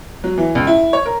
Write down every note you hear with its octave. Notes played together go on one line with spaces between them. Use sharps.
F#3
E3
C#2
E4
C#5
A#4